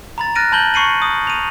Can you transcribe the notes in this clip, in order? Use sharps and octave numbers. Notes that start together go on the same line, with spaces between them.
A#5 B5 A6
F6 F#6 A6 A#6 D7 D#7
A5 B5 G6 F#7 G7
B5 C#6 C7 C#7 D#7 F#7
D#6
D#7 F7